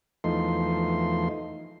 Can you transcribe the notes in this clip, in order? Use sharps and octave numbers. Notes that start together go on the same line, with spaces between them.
E2 F3 A3 D#4 C6